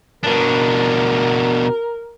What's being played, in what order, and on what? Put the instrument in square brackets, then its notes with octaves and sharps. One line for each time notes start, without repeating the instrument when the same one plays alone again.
[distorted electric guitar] B2 D4 [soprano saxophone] A#4